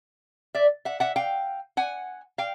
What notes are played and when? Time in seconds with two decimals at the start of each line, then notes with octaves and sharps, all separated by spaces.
0.55 D5 E5
0.85 E5 F#5
1.00 E5 F#5
1.16 F5 G5
1.77 F#5 G#5
2.38 F5 G5